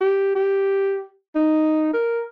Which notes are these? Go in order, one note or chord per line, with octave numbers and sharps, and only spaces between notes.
G4
G4
D#4
A#4